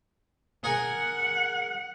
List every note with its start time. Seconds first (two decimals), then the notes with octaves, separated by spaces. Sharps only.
0.64 G#4 A#4 F#5 G#5